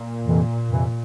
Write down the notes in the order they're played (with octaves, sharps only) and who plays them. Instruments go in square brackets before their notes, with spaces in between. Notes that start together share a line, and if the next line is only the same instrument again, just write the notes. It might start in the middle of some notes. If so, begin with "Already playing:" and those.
Already playing: [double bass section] A#2
[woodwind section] F2 C3 E3
F2 C3 E3